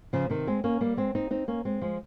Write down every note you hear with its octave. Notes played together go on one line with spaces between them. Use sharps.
C#3 F3
C3 D#3
G#3 C4
A#3 C#4
G3 A#3
G#3 C4
C4 D#4
C4 D#4
A#3 C#4
G#3 C4
F3 G#3